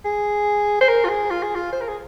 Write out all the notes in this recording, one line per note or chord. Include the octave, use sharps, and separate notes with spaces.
G#4
C5
A#4
F4
G#4
F4
G#4
F4
C5
A#4
G#4